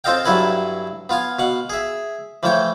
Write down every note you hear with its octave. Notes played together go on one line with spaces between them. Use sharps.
C4 F4 A4 D#5 F5 G5
G2 F#3 E4 A4 B4 G#5
B3 F4 F5 G#5
B2 F5 F#5
G#4 E5
E3 F3 A3 C#5 G5